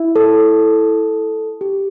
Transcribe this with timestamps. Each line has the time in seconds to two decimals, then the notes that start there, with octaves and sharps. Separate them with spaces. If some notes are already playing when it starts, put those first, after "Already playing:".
Already playing: E4
0.16 A4
1.61 G4